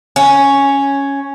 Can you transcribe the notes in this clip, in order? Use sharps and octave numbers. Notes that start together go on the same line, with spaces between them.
C#4